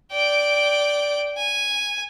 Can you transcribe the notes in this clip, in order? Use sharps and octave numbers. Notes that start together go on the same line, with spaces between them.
D5 G5
G#5